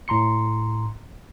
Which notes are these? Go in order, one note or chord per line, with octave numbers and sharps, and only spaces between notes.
A2 A#5 C6 C#7